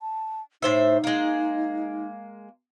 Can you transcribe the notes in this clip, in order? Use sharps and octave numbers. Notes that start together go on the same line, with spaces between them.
A5
A2 D#4 C5 E5
G#3 A#3